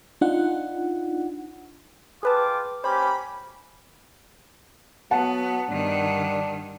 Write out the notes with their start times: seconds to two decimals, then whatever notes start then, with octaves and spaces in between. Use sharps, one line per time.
0.21 D4 D#4 F4 F#5
2.23 F4 G#4 B4 G5 A5 D6
2.84 A#3 C#4 G4 C5 B5
5.11 F#3 B3 F#5 A5
5.70 G2 D#3 D4